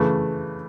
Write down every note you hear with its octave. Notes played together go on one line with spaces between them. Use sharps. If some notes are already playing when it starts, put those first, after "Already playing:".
Already playing: C#3 E3 A3